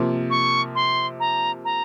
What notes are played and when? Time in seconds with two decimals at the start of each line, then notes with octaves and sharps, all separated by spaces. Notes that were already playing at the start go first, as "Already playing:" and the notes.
Already playing: C3 F3 A#3
0.30 C#6
0.75 C6
1.20 A#5
1.65 A#5